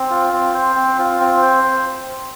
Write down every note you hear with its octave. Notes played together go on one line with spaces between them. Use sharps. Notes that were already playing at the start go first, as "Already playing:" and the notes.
Already playing: C4
F4
C4
C5
C4
F4
C4
C5